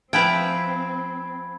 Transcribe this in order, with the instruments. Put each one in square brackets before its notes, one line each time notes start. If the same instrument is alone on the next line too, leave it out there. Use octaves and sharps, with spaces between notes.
[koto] F3 E4 B4 [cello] C4 [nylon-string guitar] G5 [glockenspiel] G#5 B5 G#6